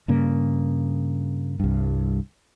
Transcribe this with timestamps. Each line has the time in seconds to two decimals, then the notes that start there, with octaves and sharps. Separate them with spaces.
0.08 G2 C#3 A#3
1.60 C2 G2